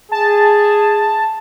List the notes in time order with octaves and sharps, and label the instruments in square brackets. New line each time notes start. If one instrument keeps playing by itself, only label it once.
[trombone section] G#4 [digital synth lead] A5